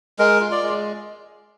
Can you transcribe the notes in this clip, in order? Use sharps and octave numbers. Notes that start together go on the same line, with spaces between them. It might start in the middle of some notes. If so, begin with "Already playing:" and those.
G#3 A#4
F4
D5
G#3